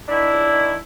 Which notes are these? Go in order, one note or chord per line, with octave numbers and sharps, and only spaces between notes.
D#3 D4 E4
C#2
D#3